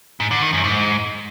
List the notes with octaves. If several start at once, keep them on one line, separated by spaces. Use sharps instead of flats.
G#2
D3
D#3
F#2
G#2